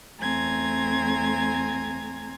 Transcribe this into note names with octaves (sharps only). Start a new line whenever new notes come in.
E2 A3 C4 G#5 A#5 G#6